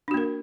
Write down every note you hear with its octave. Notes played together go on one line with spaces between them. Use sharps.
A#3 D4 F#4 A#4